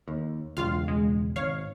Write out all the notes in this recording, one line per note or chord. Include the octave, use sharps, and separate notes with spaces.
D#2
E1 C#2 F4 F5
G#3
G#1 C#5 F5